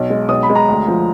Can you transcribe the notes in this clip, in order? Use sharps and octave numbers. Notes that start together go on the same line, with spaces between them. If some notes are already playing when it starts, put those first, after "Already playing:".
Already playing: B1
G#3
B1 D#6
B5
G#3
A#5
D2
F3